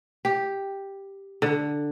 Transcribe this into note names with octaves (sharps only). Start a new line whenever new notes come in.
G4
D3